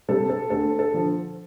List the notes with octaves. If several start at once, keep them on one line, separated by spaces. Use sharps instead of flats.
C3 G3 A4
A4
D2 A4
A4
D3 F3